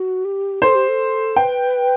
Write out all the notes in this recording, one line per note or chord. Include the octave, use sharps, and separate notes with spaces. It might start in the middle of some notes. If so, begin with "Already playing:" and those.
Already playing: F#4
G4
A4 C5
G4
A4
B4 G5